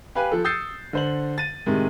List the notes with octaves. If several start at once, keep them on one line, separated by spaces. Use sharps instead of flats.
G4 B4 F5 G#5 F#6
F3 A4
D#6 E6 G6 A6 C7 C#7
D3 C5 F#7
A6 D#7
A2 C3 D#3 G#3